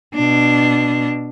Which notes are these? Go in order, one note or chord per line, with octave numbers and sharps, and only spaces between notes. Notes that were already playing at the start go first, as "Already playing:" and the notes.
B2 D4